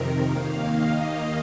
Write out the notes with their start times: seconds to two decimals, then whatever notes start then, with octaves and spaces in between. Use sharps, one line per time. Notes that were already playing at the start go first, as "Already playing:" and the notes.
Already playing: F2 C3 D#3 A#4
0.26 D#2 D#3 A#3 F5
0.71 D#5